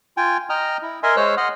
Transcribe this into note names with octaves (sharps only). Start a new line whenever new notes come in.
F4 G5 G#5
D#5 G5 A#5 D#6 F6
E4
A#4 D#5 E5 G#5 C6
G#3 C5 C#5 E6 F#6
D#5 F#5 C6 D#6 F6